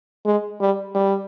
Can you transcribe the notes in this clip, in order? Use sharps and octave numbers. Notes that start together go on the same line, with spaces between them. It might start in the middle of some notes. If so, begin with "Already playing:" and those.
G#3
G3
G3